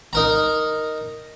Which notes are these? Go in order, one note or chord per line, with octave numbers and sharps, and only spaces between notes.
D#4 A#4 A#5